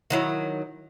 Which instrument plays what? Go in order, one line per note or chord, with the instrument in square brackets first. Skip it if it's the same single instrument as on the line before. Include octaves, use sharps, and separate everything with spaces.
[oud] D#3 F#3 E4